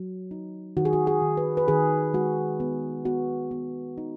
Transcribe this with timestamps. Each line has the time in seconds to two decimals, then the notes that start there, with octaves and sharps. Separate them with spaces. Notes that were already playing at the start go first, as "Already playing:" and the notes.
Already playing: F#3
0.31 D#4
0.77 D#3 F#4
0.85 G#4
0.93 F#4
1.07 G#4
1.22 D#3
1.37 B4
1.57 B4
1.68 D#3 G#4
2.14 G#3 F#4
2.60 B3
3.05 B3 F#4
3.51 B3
3.98 D#4